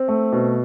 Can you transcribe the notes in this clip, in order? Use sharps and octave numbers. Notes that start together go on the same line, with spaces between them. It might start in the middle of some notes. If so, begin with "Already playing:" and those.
Already playing: C4
A3
B2